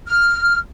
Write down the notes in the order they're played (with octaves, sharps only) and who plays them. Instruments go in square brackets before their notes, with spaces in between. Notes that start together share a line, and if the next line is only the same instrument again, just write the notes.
[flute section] F6